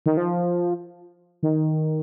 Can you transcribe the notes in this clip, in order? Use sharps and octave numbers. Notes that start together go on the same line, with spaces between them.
D#3
F3
D#3